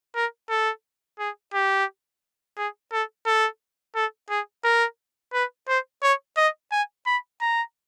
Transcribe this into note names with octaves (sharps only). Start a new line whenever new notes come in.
A#4
A4
G#4
G4
G#4
A4
A4
A4
G#4
A#4
B4
C5
C#5
D#5
G#5
B5
A#5